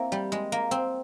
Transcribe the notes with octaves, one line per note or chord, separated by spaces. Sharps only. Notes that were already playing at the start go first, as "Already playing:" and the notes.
Already playing: A#3 C4 E4
G3
G#3
A#3
C4